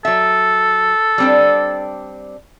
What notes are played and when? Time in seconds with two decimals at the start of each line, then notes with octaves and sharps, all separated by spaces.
0.05 F#3 A4 E5
1.18 G3 C4 D4